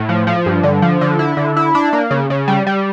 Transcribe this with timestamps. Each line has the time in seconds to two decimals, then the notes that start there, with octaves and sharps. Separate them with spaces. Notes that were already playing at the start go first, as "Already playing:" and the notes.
Already playing: A2
0.09 F3
0.27 F3
0.46 G2
0.63 D3
0.82 F3
1.01 D3
1.19 E4
1.37 D3
1.57 E4
1.75 D4
1.93 A#3
2.11 C#3
2.30 C#3
2.48 G3
2.67 G3